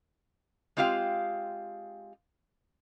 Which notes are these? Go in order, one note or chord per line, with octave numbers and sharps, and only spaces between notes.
G#3 C4 F4 G4 F5